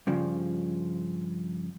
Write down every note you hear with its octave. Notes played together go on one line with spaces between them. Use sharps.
G2 C#3 F3